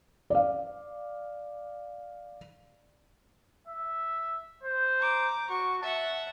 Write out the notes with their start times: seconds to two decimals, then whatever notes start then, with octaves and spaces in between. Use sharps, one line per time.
0.30 D5 F5
3.67 E5
4.63 C5
4.99 A#5 D6
5.50 F#4 C#6
5.83 E5 F#5 A5